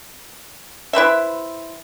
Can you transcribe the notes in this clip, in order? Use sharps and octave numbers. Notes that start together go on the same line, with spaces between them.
E4 B4 C5 E5